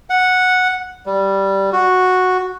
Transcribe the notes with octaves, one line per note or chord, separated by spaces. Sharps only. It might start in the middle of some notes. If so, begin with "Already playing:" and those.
F#5
G3
F#4